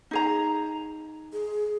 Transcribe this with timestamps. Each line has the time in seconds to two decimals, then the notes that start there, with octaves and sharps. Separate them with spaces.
0.11 D#4 G#4 A#5
1.33 G#4